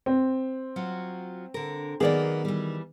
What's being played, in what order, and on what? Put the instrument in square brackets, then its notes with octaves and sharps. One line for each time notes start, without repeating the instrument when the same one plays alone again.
[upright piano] C4
[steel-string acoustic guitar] F#3 F4 F#4
D3 A#4
[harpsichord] D#3 [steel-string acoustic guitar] F#3 A#3 B3 [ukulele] G#4 D5
[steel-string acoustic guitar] E3 G3